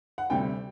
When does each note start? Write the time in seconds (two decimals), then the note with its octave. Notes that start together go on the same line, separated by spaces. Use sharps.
0.18 F#5
0.30 D2 C3 G3 G5